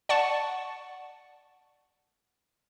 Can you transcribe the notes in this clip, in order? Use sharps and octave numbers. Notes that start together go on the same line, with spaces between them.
D5 F#5 A5 C#6